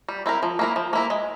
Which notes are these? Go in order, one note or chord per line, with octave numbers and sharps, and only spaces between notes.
G3
C4 E4 A#4
F3
A#3 E4 A#4
F3
A#3 E4 A#4
G#3